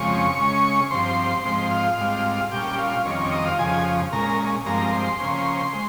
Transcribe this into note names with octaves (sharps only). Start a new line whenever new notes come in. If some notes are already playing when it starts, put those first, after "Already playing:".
Already playing: F2 C#3 F3 G#3 C4 C#5 C#6
C#3 G#3 C#4
G2 F3 C4 C5 C6
G#2 F3 C4 C5 C6
F4 F5
G#2 G3 C4
A#2 G3 C#4 G4 G5
F4 F5
F2 D#3 G3 C4 C#4 C#5
C#4 C#5
D#4 D#5
F4 F5
F2 C#3 F3 G#4 G#5
A#2 G#3 C#4 A#4 A#5
G2 F3 G#3 C4 A#4 A#5
C5 C6
C#3 F3 A#3 C#4
G#3